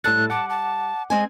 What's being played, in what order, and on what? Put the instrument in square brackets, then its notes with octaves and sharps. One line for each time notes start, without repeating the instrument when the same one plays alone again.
[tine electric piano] A2 A4 A6 [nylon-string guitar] G3 [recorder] F#6
[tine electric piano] F#5 D6 [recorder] A5
[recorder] A5
[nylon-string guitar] G#3 C4 G#5 [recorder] D#5